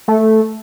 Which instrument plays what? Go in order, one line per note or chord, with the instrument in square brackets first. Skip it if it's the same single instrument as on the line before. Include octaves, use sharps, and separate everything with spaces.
[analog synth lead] A3